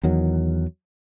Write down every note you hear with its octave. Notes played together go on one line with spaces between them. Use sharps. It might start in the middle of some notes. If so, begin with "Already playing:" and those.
E2 D#3 F#3